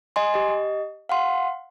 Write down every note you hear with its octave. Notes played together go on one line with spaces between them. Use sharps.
D#5 G#5 C6
G4 D#5
F5 F#5 C6